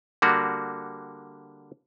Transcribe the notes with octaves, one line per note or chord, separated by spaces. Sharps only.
D3 G3 A#3 F#4